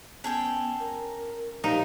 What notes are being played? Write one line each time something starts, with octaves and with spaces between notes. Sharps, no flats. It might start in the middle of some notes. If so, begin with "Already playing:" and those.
B3 C#4 G#4 A4 G5
A#4
A#2 F3 D#4 G4 A#4